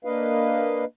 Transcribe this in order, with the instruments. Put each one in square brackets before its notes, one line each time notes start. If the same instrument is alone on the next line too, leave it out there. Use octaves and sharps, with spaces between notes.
[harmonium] A#3 D4 B4 D#5 F5